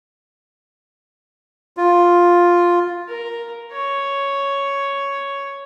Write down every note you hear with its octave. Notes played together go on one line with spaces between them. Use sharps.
F4
A#4
C#5